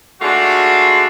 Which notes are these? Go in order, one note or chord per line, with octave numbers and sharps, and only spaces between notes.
G#3 A3 D4 F4 F#4